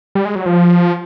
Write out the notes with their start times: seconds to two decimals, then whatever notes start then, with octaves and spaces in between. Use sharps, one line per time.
0.15 G3
0.25 G#3
0.35 F#3
0.46 F3